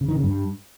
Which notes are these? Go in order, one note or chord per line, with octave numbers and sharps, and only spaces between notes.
C#3
D#3
C#3
G2